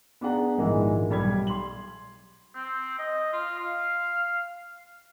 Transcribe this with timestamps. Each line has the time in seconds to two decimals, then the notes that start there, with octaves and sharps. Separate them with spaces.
0.21 B3 D4 G#4 F#5 A#5
0.58 A#1 G#2 D#3 E3 G#3
1.10 B1 G3 B5 G#6
1.47 C6 F#7
2.55 C4
2.99 D#5
3.33 F4
3.59 F5